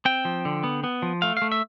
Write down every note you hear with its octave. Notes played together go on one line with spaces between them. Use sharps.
C4 G5
F3
D3
B3
B3
F3
A3 F5
A3 F5
E5